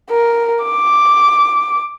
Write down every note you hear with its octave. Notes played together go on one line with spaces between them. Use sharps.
A#4
D6